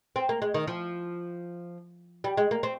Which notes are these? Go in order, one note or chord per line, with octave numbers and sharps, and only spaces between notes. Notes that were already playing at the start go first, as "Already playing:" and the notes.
C4
A#3
G#3
D#3
F3
G3
G#3
A#3
C4